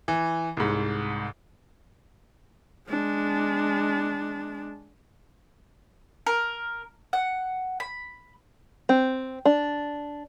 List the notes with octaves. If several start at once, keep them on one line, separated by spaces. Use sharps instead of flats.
E3
C2 G#2
G#3 D4
A#4
F#5
B5
C4
D4